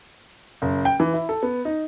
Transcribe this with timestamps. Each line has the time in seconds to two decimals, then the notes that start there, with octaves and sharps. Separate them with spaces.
0.62 F#1
0.85 G5
1.00 E3
1.14 E4
1.29 A4
1.43 B3
1.65 D#4